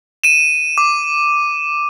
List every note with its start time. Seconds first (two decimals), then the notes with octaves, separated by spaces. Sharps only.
0.24 D#7 E7
0.78 D6